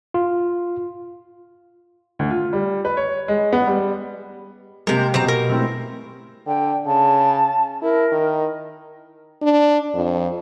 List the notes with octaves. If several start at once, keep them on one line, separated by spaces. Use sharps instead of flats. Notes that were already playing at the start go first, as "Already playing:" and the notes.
F4
D2
F4
G3
B4
C#5
G#3
B3
G3
C3 G#3 A#3 G4 A#4
B2 G#3 C4 A#5
A#4
A3 C4 E4
D3 G5
C#3 A5
E4 A#4
D#3
D4
F2